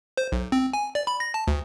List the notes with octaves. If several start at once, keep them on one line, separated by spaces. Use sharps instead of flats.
C5
B1
C4
G#5
D5
B5
A#6
A5
D2